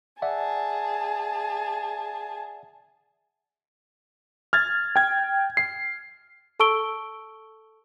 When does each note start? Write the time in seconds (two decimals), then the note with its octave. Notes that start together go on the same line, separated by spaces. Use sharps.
0.22 G#4 D5 E5 F#5 A5
4.53 F6 G#6 A6
4.96 G5 G#6
5.57 C7
6.60 A4 A5 C#6 E6 D7 G7